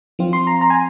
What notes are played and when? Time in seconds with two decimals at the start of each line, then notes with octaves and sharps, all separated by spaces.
0.19 F3 C4 F4
0.33 C6
0.47 A#5
0.61 A#5
0.70 G#5